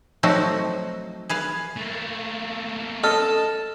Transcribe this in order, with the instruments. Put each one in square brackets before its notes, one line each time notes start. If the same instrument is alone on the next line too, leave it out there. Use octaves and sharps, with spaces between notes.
[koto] F3 F#3 A3 C4 D#4 F#4
G#4 B4 F5
[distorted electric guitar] A3 A#3
[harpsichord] A4 [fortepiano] D#5 F6 [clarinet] A5